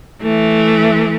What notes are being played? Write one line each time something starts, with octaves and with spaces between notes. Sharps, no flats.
E3 A3